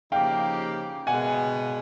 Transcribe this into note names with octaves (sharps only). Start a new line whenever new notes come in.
C#3 F3 A#3 D#4 G4 F5 G5
B2 G#3 B3 F#5 G#5